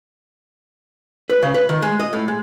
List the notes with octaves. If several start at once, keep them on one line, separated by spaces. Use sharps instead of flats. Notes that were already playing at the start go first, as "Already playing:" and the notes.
B4
C#3
B4
D#3
G#3
D#5
A2
G#3